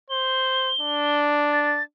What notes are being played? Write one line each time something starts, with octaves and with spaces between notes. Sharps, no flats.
C5 G7
D4
A6